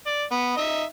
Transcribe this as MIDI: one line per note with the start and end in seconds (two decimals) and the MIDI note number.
0.06 0.23 74
0.31 0.52 59
0.57 0.83 63
0.57 0.83 76